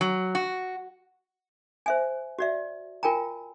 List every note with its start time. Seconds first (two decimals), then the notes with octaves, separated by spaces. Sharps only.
0.01 F#3
0.35 F#4
1.86 C5 E5 G#5
2.39 F#4 D5 E5
3.03 F4 A#4 G5 G#5 A#5